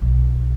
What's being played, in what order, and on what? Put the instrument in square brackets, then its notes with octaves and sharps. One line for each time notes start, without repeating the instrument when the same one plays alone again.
[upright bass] B1